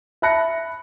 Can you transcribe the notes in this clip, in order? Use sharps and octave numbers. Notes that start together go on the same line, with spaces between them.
E5 A5 B5 F#6 A#6 C#7